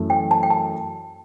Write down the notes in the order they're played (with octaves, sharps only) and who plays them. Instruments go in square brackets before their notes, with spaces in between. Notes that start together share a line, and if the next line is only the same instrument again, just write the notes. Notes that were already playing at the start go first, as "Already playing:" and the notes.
Already playing: [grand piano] F#2 E3 A3 E4
[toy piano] G5
A5
G5
A5